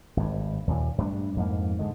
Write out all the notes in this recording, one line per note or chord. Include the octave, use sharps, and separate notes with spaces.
G#1 G2
D#2 A#2
G2 G3 A3 D4
F2 G#2 A#3
G#2 D3 G#3